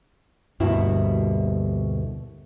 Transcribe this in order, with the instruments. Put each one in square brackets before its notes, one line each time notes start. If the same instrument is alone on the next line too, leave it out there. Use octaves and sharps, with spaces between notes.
[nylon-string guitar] D2 G2 B2 A#3 E4 F#4